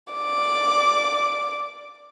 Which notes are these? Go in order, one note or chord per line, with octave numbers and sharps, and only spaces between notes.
D5 D6